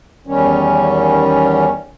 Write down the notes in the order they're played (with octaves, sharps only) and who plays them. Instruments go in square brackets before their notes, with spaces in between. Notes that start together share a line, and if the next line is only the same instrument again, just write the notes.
[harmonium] E2 D#3 G3 C#4